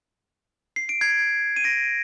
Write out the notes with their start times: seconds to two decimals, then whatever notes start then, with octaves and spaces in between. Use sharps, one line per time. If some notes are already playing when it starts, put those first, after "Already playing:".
0.76 C7
0.89 D7
1.01 G#6 C7
1.56 D#7
1.64 A#6 D7